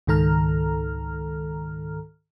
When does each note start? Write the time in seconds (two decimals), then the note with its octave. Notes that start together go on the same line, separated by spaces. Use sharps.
0.07 C#2 G#2 D#3 A4 A#5 F6